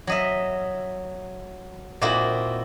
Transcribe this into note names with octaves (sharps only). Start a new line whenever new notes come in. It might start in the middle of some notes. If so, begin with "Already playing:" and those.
F#3 D#5 E5
A#2 A#3 C4 D#4 E4 F#4